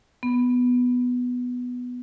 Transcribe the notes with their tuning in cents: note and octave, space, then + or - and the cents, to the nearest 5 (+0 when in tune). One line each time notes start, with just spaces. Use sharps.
B3 +0